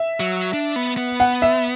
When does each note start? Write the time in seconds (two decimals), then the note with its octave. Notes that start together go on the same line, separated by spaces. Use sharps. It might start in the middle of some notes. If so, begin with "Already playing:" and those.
Already playing: E5
0.20 F#3
0.53 D4
0.76 B3
0.97 B3
1.20 F#5
1.42 E5